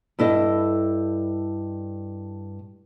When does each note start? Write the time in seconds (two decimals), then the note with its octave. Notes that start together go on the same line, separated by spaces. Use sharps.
0.19 G2 E4 A4 D#5